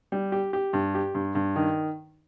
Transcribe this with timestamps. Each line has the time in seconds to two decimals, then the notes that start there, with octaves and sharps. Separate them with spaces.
0.12 G3
0.32 G4
0.53 G4
0.73 G2
0.95 G4
1.15 G2
1.35 G2
1.56 D#3